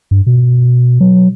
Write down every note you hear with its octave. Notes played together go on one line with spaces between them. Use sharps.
G2
B2
F#3